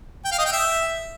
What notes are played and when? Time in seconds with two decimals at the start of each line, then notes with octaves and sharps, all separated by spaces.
0.25 G5
0.32 F5
0.39 D#5
0.45 G5
0.52 E5